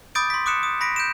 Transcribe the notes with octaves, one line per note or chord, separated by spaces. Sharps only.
B5 D6 D#6 G6 A6 D7
C6 B6
D6 D#6 F#6 C#7 E7
D#6
B5 A#6 B6 D7
G6 D7 E7